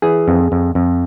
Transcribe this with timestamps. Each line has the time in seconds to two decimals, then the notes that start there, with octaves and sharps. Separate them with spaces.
0.02 E3 G#4
0.28 F2
0.52 F2
0.75 F2